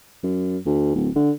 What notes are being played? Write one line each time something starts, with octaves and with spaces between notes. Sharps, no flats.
F#2
D2
D1
D3